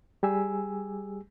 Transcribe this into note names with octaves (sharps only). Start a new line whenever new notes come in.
G3 G4 G#4 G#5 E6